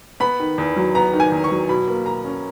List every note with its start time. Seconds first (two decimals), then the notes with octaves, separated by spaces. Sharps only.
0.20 B3 B5
0.40 D#3
0.58 E2
0.76 F#3
0.95 B3 A#5
1.13 D#3
1.20 G#5
1.32 E2
1.44 C#6
1.51 F#3
1.69 B2 B5
1.88 A#3
2.06 B2 A#5
2.24 C#4